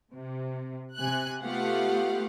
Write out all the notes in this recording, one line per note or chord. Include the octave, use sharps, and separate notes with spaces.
C3
C3 G#5 F#6
A3 B3 F4 G4 F5 F#5